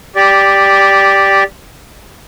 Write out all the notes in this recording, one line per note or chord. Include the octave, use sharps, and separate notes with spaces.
G4 D5